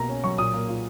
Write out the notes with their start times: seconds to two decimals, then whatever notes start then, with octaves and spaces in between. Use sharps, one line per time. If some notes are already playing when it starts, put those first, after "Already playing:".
Already playing: B2 A#3 A#5
0.09 C#4
0.24 F#3 C#6
0.38 A#2 D#6
0.54 A#3
0.69 F4